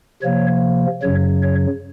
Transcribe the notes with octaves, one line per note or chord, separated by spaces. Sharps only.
C3 F3 A#3 C#5
F#2 C#3 F#3 C#5
C#5